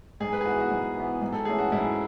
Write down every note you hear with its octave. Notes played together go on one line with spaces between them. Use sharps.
G#2 G#4
B4
G#4
E3 B3 F#4
F#4
G#2
E3 B3
G#2
A4
E3 A3 C#4 G#4
F#4
G#2 E4